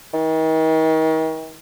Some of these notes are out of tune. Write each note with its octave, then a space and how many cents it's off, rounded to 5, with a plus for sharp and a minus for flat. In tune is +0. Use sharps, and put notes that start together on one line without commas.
D#3 +40